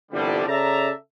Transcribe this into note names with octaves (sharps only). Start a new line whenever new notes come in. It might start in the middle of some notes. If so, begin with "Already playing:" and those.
G1 C2 D3 F3 G3
C#3 A4 D5 E5 A5 A#5